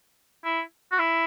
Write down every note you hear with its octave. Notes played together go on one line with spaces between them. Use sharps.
E4
F#4
E4